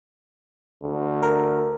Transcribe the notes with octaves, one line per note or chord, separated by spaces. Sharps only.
D2
A#4